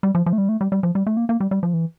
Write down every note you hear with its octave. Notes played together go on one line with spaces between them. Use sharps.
G3
F3
F3
A3
G3
A3
G3
G3
F3
G3
A3
A#3
A#3
G3
G3
F3
E3